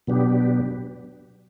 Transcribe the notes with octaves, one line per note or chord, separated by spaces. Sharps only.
B2 F#3 B3 D4 G4